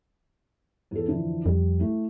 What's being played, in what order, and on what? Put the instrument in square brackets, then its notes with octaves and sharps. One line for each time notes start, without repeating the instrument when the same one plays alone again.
[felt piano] E2 A4
F2 D3 E3
[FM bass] F2 [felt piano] G3
[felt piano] A3 E4